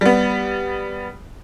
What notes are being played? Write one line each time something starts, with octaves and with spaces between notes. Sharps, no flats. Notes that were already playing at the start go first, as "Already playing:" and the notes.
G3 B3